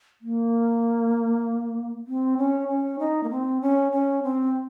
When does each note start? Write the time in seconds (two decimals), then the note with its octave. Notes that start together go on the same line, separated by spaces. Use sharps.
0.21 A#3
2.07 C4
2.38 C#4
2.69 C#4
2.99 D#4
3.23 A#3
3.31 C4
3.62 C#4
3.92 C#4
4.23 C4